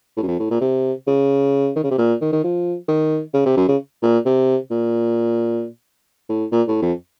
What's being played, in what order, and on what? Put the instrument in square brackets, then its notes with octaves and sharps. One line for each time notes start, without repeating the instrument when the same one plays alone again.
[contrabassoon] A2
F#2
F2
A2
A#2
C3
C#3
D#3
C#3
C3
A#2
D#3
D#3
F3
D#3
C#3
C3
F#2
C#3
A#2
C3
A#2
A2
A#2
A2
F2